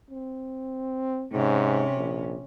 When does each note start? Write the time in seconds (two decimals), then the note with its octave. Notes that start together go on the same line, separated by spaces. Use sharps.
0.11 C4
1.32 G#2 C3 C#4
1.97 A#1